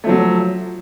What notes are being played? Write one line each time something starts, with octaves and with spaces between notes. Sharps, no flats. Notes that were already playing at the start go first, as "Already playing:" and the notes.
F3 F#3 A3